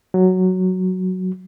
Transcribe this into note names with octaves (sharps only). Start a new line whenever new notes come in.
F#3